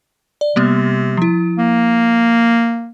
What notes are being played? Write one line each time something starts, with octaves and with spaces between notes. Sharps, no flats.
D5
C3 G3 A#3 B3
F3 E4
A#3